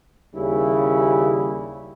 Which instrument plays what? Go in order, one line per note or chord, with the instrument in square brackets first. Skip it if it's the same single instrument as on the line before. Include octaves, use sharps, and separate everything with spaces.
[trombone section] D#2 C#3 G3 C#4 E4